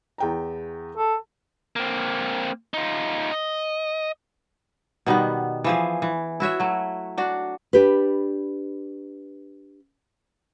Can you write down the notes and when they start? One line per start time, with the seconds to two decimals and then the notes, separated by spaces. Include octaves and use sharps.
0.18 E2 G5 A#5
0.97 A4
1.76 A#3 C4
2.74 D#4 F4
3.32 D#5
5.06 B2 D#3 G3 B3
5.64 E3 F3 G#4
6.02 E3
6.40 E4 F#4 C#5 E5
6.60 F#3 A3
7.18 D4 F#4
7.73 D4 G4 B4